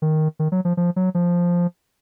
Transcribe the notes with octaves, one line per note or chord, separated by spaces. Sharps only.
D#3
D#3
F#3
F3
F3
F#3
F3